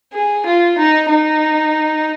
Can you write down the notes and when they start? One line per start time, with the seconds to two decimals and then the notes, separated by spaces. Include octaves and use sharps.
0.13 G#4
0.46 F4
0.78 D#4
1.09 D#4